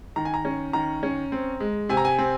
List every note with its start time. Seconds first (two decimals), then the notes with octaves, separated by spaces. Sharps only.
0.16 D#3 A#5
0.25 G#5
0.34 A#5
0.45 C#4
0.73 D#3 A#5
1.03 C#4
1.32 C4
1.60 G#3
1.89 C3 G#5
1.97 A#5
2.05 G#5
2.18 C4